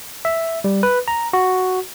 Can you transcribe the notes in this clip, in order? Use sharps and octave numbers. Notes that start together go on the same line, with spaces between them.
E5
G3
B4
A#5
F#4